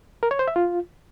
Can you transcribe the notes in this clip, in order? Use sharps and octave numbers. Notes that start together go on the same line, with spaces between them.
A#4
C#5
C5
E5
F4